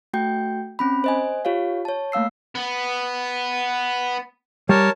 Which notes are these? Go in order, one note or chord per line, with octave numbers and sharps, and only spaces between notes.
A3 F#4 G5 G6
C4 C#4 B5
C5 D#5 G#5
F4 G4 C#5 F5
C#5 A5
A3 A#3 F5 E6 C7
B3
G3 A#4 C#5 A5